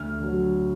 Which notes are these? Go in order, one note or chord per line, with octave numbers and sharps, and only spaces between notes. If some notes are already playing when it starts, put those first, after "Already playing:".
Already playing: D2 F6
D3 F#3